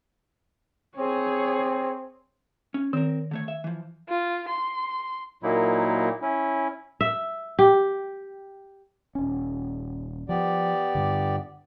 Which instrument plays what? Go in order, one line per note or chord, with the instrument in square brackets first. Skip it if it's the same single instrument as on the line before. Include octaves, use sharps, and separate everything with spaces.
[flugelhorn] C4 [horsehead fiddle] G#4 C#5
[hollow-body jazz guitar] C#4
[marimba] D#3 [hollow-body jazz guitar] C4 A#4
[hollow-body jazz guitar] D3 A3 C#5
E5
E3 F3
[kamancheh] F4
C6
[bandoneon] A#2 F#3 A#3 D#4 E4
C#4 E4
[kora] E5
G4
[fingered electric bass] D#1 C#4
[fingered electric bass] F3 [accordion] B3 G4 D5
[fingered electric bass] G2 D3